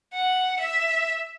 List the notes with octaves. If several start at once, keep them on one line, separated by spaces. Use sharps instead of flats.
F#5
E5